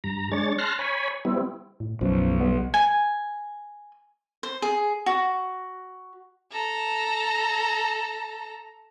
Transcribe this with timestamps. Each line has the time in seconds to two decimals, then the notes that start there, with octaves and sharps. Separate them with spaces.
0.04 G2 A#5
0.32 G#3 D4 C#5 A6
0.58 A5 C6 F6 F#6 A#6
0.79 C#5 G#5 B5
1.25 G3 B3 C4 E4
1.80 A2
2.01 B1 F#2 B2 F3
2.40 G3 B3
2.74 G#5
4.43 C5
4.62 G#4
5.06 F#4
6.52 A4 A#5